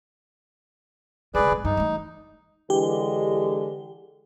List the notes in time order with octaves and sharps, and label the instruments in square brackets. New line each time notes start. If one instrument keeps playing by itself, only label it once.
[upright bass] C#3 G#3 [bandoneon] G#4 B4 D5
[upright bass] D1 G#3
[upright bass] G2 [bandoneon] D#4
[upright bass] E3 A3
[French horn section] D3 E3 G#3 [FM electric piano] G4